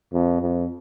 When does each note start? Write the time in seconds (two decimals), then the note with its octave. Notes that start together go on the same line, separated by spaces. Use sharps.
0.13 F2
0.41 F2